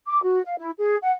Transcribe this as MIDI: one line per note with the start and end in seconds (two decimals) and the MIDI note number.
0.07 0.22 86
0.23 0.40 66
0.45 0.57 77
0.57 0.70 64
0.77 0.95 68
1.02 1.13 78